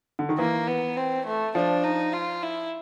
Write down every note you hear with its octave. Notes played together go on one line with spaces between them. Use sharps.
D3
D#3
E3 A#3
B3
C4
A3
F3 D4
D#4
F4
E4